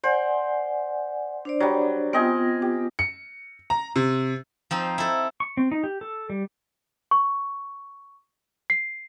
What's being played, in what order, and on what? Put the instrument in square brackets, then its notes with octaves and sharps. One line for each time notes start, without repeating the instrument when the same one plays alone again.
[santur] C5 [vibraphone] D5 F#5 G#5
[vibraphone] D4 C5 D5
[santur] F#3 G3
[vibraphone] B3 F4 [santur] C4 D#5 G#5
[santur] G4
[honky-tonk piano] C#7
A#5
C3
[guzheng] F3 C4 D#4
E4 A4
[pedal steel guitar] C#6
C4
D#4
G4
A4
G3
[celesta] C#6
C7